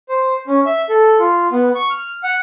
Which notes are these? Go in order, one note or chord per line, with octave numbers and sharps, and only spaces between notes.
C5
C#4
E5
A4
F4
B3
C#6
F6
F#5